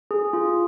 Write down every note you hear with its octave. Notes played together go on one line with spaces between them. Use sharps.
G#4
F4